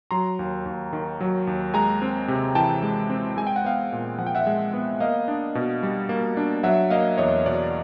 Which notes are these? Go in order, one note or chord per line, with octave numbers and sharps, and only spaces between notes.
F#3 A#5 C6
D#2
D#2
D#3
F#3
D#2
G#3 G#5 A#5
C4
C3
E3 G5 A5
G#3
C4
G#3 G#5
G5
F#5
B3 F5 G5
A#2
F3 F#5
G5
E5 F#5
G#3
B3
A#3 D#5 F5
D4
B2
G3
A#3
D4
F#3 E5 F#5
A#3 D#5 F5
E2 C#5 D#5
B2 D5